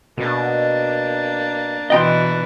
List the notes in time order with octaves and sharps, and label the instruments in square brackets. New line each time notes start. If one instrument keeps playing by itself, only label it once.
[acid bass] B2 [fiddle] A#3 D4
[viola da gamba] B2 E3 E4 [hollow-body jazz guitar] D#5 G5 C6